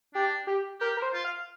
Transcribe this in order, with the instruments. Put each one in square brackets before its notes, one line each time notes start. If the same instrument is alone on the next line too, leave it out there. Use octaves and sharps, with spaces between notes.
[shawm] D4 [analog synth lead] G4
[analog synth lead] G4
[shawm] G4 [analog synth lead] A#4
[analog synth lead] A#4
C5
[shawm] F4
[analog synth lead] F5